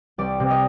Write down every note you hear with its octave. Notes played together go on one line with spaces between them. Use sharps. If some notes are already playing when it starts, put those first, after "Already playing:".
C2 D5
C3
D#5